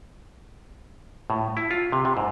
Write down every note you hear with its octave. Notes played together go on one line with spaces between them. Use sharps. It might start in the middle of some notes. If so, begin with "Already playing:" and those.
A2
E4
F4
C3
C3
G#2